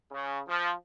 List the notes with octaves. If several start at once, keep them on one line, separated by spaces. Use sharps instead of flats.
C#3
F3